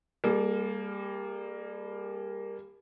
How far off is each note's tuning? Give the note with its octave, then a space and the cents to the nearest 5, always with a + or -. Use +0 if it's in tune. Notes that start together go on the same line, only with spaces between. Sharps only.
G3 +25 A#3 +0 A4 -45